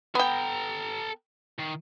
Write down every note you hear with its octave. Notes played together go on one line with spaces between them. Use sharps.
B3 A4 G5 A#5
D#3